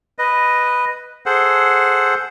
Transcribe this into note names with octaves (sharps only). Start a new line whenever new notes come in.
B4 D#5
G#4 A4 C5 F#5